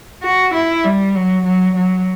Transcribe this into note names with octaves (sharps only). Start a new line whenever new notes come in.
F#4
E4
G3
F#3
F#3
F#3